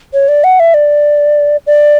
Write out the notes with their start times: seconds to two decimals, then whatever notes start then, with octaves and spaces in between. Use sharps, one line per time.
0.14 C#5
0.28 D5
0.44 F#5
0.60 E5
0.74 D5
1.67 D5